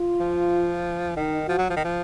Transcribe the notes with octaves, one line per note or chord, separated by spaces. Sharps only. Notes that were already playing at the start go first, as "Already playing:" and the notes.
Already playing: F4
F3
D#3 D#4
F3 F#4
F#3
F3
D#3
F3